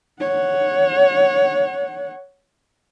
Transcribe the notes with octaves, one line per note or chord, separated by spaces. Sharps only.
C#5 F#5